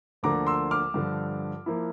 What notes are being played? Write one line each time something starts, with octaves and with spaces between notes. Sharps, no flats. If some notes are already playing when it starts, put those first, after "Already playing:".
D2 D3 F3 A#3 A#5 D6
C6 E6
D6 F6
G2 D3 F3
F3 A#3 E4